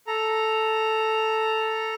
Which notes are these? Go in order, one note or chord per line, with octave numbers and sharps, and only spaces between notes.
A4 A#5